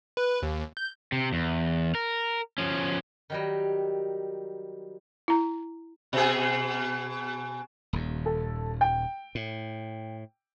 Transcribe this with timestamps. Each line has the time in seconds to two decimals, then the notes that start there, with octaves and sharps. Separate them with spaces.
0.17 B4
0.42 D#2
0.77 G6
1.12 C3
1.33 E2
1.95 A#4
2.58 F3 C#4
3.30 D#3 F#3 G3
5.28 E4 A#5
6.13 B2 G#4
7.93 D#1 D#2
8.26 A4
8.81 G5
9.35 A2